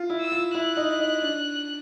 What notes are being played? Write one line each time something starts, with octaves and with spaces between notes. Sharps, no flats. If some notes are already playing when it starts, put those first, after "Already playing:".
Already playing: F4
E4
E6
F4
E4 F#6
D#4
D#4
D4